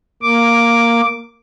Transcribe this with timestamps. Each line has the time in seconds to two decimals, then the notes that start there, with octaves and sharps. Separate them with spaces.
0.22 A#3 D6